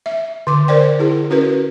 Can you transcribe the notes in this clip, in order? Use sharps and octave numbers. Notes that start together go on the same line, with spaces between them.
E5
D3 D6
A#4 C5 D5 G5
E4 G#4
C#4 F#4 A#4 B4